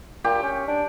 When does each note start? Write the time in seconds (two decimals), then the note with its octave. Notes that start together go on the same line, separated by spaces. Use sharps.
0.24 A#2 G4
0.43 C#4
0.68 D4